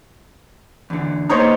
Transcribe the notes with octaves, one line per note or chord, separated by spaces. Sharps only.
E2 D3
A#3 B3 D#4 C5 C#5 A#5